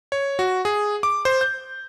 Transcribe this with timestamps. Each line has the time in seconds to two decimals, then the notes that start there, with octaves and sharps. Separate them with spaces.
0.12 C#5
0.39 F#4
0.65 G#4
1.03 D6
1.25 C5
1.41 G6